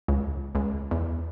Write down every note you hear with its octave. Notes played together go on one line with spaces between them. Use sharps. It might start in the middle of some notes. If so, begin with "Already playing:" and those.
C#2
C#2
E2